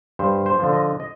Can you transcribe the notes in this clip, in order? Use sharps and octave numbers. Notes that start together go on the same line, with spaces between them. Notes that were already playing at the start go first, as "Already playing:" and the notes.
G2 C5
C5
D3 F3
D#5
D#5